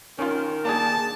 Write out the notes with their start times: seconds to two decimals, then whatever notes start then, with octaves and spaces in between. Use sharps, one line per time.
0.19 D#3 C#4 F4
0.65 A#3 D4 G#4 A5